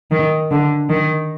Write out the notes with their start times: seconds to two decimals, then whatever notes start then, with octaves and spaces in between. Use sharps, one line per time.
0.11 D#3
0.51 D3
0.90 D#3